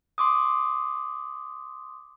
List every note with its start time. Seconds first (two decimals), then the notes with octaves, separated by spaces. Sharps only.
0.18 C6 D6 D#6